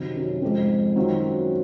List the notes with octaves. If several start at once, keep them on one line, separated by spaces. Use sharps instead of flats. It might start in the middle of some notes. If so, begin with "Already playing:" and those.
Already playing: C3 D#3 F#3
F#2
F2 G#2 F3 G#3 C4
F#2 D#3 F#3 C4 F4